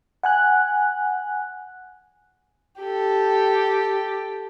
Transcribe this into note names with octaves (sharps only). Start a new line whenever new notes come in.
F#5 G#5 F#6
G4 A4